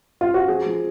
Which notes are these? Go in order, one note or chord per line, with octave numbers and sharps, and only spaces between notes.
F4
F#4
F3 G#4
F3